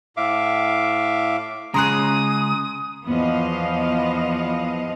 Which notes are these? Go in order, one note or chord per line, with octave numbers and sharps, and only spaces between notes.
A2 E5 F5 D6
C#3 G#3 G#4 A#5 C6 D#6 F#6
E2 F3 B3 D#5 F5